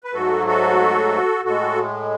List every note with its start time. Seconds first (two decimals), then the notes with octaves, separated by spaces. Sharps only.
0.04 B4
0.13 G#2 F#3 A3 F#4 A4
0.47 F#4 A4
1.45 A2 G#3 F#4 A4